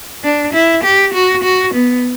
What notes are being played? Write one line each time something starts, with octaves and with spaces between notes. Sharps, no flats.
D4
E4
G4
F#4
F#4
B3